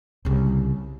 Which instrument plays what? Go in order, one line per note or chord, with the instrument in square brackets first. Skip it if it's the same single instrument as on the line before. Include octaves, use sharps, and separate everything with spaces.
[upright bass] C2 C#3